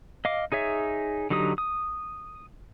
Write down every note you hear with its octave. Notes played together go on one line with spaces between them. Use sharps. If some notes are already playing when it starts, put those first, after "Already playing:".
D#5 F5 D6
D#4 G#4 C#5 E5
D3 F#3 D#4 G4 D#6
D#6